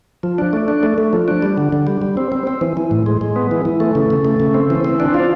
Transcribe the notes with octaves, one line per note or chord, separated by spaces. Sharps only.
F3
D4
A3
D4
A3
A3
F3
D4
G3
D3
D3
G3
G3
C4
C4
C4
E3
E3
A2
G#3
G#3
B3
E3
E3
A3
C#3
C#3
A3
C#3
C4
E3
C4
D4
F4